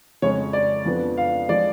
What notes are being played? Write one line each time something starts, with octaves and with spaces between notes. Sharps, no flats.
F2 C#3 G#3 C#4 C#5
D5
F2 F3 B3 D4
F5
F3 G#3 D5